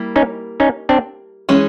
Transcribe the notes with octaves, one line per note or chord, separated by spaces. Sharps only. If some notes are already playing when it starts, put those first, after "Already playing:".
Already playing: G3 A#3 E4
C#4 D#4
C#4 D#4
C4 D4
E3 G#3 C#4